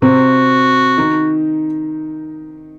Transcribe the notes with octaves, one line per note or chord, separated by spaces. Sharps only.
C3 C4 F#4
D#3 D#4